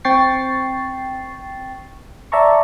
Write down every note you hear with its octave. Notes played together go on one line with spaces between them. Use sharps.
C4 G5 C#6 A6 C7
D5 E5 A5 A#5 C#6